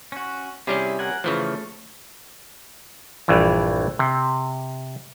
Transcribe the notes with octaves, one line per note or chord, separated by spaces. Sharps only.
C#4 F#4
C3 G3 C#4 E4 G#4
A#4 F#5 G#5
C#3 E3 F3 A3
A#1 G2 E3
C3